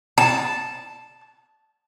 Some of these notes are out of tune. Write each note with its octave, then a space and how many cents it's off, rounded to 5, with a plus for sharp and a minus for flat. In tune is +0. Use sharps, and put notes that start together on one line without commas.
A5 -5